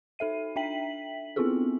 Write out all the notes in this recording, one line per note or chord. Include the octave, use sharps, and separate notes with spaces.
D#4 A4 E5 D#7
D4 E5 G5 B6 F#7
B3 C4 E4 F4 G#4 A4